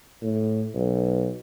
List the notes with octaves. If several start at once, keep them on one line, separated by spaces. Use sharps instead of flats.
A2
B1